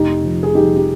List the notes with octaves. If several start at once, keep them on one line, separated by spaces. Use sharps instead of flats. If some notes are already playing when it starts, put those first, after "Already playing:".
Already playing: F1 D#4 G4
F3
G#4
F3 D#4 G4
D#4 G4